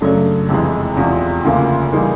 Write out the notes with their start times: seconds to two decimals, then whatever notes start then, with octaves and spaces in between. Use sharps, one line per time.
0.01 F#2 C#3 F#3 A3 D4
0.49 F2 C3 E3 G#3
0.97 E2 C3 F3 G#3
1.45 D2 C#3 F3 A#3
1.93 E3 G3 A#3 D#4 G#4